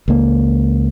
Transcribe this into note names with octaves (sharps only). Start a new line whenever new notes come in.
C#2 A#3